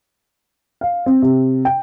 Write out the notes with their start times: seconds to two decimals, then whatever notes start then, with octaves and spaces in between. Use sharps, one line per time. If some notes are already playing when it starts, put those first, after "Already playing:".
0.81 F5
1.06 C4
1.22 C3
1.65 G5